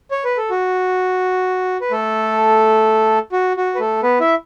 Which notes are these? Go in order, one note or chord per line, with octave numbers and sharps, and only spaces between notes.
C#5
B4
A4
F#4
B4
A3 A4
F#4
F#4
B4
A3 A4
B3 B4
E4 E5